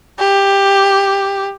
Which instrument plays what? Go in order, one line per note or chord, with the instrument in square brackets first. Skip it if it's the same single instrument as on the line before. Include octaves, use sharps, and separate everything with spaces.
[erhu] G4